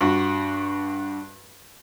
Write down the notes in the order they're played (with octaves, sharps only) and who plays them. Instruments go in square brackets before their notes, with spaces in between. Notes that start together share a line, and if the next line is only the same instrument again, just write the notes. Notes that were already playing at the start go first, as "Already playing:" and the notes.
[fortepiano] G2 F#4